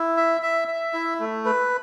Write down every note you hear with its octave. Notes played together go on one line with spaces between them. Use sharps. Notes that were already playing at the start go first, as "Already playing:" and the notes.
Already playing: E4
E5
E5
E5
E4
A3
B4